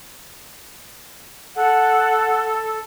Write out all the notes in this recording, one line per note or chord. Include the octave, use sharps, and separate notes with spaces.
A4 F#5